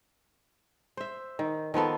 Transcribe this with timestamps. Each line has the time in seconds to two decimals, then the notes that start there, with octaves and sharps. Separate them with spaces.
0.97 C5 E5
1.39 D#3
1.74 D#3 F3 B3 A4